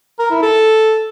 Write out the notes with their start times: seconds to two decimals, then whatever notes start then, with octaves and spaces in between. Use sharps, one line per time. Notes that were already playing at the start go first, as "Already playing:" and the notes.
0.19 A#4
0.31 E4
0.43 A4